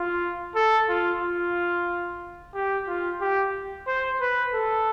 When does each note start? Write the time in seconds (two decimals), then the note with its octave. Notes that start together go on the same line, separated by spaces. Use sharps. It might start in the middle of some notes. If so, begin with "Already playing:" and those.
Already playing: F4
0.55 A4
0.89 F4
1.22 F4
2.55 G4
2.88 F4
3.21 G4
3.87 C5
4.21 B4
4.54 A4